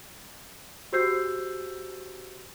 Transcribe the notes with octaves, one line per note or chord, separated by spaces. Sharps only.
F#4 G4 C5 E6 G6 C7